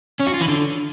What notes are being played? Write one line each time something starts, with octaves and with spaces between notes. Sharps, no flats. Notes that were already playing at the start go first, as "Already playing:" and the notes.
C#4
F#4
F4
E3
D3